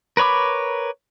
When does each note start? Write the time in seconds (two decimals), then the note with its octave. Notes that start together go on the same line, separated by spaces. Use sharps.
0.17 A#4 B4 C#5 B5 D6